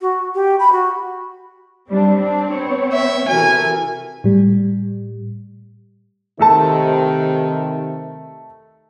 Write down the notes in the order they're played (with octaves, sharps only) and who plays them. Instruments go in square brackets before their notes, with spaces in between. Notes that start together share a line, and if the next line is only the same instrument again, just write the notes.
[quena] F#4
G4
B5
F#4
[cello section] G3 D4 [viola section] C4
[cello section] D4
B3 C#5
[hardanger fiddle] E5
[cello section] C3 E3 [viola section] F#4 A4 A#4 [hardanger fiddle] G#5
[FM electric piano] A2 G3
[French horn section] C3 D#3 [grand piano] A3 A4 A5